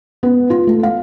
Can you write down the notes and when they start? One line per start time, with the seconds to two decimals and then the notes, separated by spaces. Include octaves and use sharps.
0.23 B3
0.50 F4
0.67 A3
0.83 F5